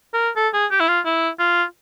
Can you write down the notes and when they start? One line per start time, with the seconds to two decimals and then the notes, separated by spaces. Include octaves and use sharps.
0.13 A#4
0.36 A4
0.54 G#4
0.71 G4
0.80 E4
0.88 F4
1.05 E4
1.39 F4